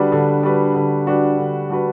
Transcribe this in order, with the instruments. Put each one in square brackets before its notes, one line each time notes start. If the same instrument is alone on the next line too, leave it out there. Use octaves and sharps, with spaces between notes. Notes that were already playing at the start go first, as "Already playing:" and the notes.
Already playing: [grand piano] D3 G3 D4 F#4 B4
D3
G3 D4 F#4 B4
D3
G3 D4 F#4 B4
D3
G3 D4 F#4 B4